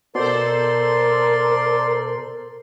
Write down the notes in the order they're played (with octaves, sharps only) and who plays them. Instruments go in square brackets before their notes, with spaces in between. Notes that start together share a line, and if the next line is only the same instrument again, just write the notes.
[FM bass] B2 [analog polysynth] A4 C5 [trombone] A#4 [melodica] D5 C6